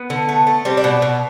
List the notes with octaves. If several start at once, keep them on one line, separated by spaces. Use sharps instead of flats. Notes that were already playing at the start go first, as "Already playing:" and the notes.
Already playing: B3
D3
A3
A3
G3 C4
D4
B2
B2